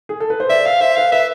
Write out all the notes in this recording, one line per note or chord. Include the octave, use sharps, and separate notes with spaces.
G#4
A4
B4
C5
D5 E5
E5 F5
C5 E5
B4 F5
B4 E5